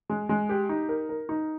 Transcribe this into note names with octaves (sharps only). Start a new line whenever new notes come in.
G#3
G#3
G4
D#4
A#4
A#4
D#4